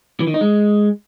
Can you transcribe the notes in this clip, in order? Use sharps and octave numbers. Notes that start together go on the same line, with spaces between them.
E3
D#3
D#4
G#3